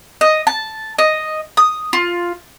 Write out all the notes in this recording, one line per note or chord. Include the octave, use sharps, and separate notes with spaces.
D#5
A5
D#5
D#6
F4